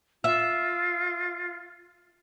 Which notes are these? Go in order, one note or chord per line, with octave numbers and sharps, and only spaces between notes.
F4 E5